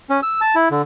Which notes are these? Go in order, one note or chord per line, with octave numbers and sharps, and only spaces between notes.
C#4
E6
A5
E4
D3